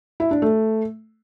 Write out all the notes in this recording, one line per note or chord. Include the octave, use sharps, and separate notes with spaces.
E4
D4
A3